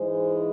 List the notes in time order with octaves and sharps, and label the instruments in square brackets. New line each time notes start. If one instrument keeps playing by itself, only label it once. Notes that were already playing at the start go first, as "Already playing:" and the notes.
Already playing: [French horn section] G#2 E3 G#3 C5